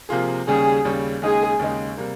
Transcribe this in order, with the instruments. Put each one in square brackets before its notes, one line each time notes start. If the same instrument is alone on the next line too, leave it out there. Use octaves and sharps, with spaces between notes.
[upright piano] C3 F3 A#3 F4 G#4
[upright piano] D#2 C#3 G3 C#4 [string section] G#4
[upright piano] D#2 C#3 G3 C#4
[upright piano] D#2 C#3 G#3 D#4 [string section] G#4
[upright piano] D#2 C#3 G#3 D#4
C3 G3 A#3